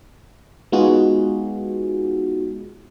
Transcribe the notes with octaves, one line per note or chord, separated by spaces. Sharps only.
G#3 B3 D#4 F4 F#4 G#4